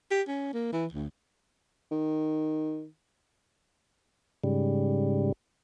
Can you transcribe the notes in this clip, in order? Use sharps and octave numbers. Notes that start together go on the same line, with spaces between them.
G4
C#4
A#3
E3
D2
D#3
G#2 C#3 G3